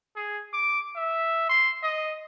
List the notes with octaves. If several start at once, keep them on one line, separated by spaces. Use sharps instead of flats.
G#4
D6
E5
C6
D#5